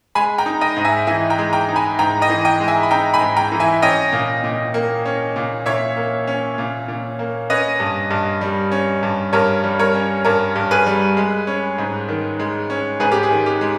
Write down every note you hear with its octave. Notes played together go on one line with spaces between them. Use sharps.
G#3 G#5 B5
G5 A#5
D#4
D#5 G5
G#2
E5 G#5
E3 E5 G#5
G5 A#5
G#3
G5 A#5
D#4
G#5 B5
G#2 G5 A#5
D#5 G5
E3
D#5 G5
G#3
E5 G#5
B5
D#4 G5 A#5
G#5 B5
G#2
G5 A#5
E3
E5 G#5
C#4 D#5 G5
A#2
A#2
A#3
C#4
A#2
A#2 C#5 E5
A#3
C#4
A#2
A#2
A#3
C#4 B4 D#5
G2
G2
G3
C#4
G2
G2 A#4 C#5
G3
A#4 C#5
C#4
G2 A#4 C#5
G2
G#4 B4
G3
G#3
C#4
G#2
D#3
G#3
C#4
G#2 G#4 B4
G4
G#4
D#3
G4
G#3